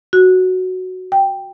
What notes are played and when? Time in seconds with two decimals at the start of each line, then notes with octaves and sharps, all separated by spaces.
0.13 F#4
1.12 G5